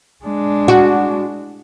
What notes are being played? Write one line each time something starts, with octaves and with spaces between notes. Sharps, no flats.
G#3 D4
F#4